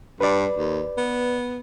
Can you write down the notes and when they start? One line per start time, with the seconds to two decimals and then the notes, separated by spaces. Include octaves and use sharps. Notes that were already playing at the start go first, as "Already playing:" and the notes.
0.21 G2 B4 D5
0.58 D#2
0.98 B3